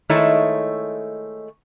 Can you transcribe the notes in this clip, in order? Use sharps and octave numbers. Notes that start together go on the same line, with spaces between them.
D#3 G#3 A3 D#4 E4 C#5